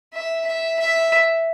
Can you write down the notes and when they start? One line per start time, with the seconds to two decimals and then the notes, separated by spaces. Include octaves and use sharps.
0.14 E5
0.46 E5
0.80 E5